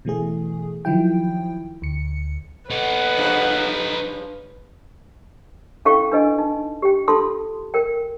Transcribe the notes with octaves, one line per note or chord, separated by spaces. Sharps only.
B2 E3 A3 G#4
D#3 F3 F#3 E4 G5
D2 C#7
B3 D#4 A4 B4 F#5
G2 C#3 F3
C#4 E4 A4 F5 G5 C#6
D4 B4 D#5 G#5
D#4
G4 G5
F4 A4 A5 C6 D#6
A#4 G5